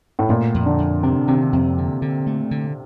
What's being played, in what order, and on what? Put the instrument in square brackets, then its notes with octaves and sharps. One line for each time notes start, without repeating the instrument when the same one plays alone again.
[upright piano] A2
[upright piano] A#2 [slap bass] A3
[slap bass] F2
[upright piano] D3
[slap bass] F2
[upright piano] C3 [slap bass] D4
[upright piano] C3 [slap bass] D#3
[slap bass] F2 [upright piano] C3
[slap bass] D3
D3
A3
D3